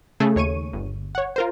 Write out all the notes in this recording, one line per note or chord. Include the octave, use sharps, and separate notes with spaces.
C#3 A3 G#4 A4
D#2 C#5 C#6 D#7
G1
C#5 F#5
F4 A#4 C5